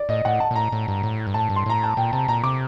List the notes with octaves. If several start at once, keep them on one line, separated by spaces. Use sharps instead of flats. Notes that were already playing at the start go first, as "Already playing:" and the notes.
Already playing: D5
A2 D#5
A2 F#5
A5
A#2
A2 A#5
A2
G2
A2
G2
A2 A5
G2
C6
A2 A#5
A5
A#2 G5
C3 A5
A#2 A#5
C3 D6